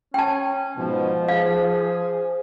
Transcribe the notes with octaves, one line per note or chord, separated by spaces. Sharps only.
C#4 G5 A5
G#2 B2 F3
G#4 C5 F5